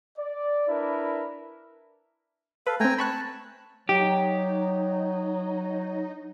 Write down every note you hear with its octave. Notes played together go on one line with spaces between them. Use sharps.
D5
D4 E4 A#4 B4
A4 B4 F5
A3 C4 G5 G#5 A#5
A5 B5 C#6 F#6
F#3 D#4 G4